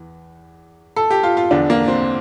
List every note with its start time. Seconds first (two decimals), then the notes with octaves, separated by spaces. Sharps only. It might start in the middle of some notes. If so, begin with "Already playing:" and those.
Already playing: E2 E3
0.96 A4
1.11 G4
1.23 F4
1.37 F4
1.51 E2 D3 F3 D4
1.70 A#3
1.88 C4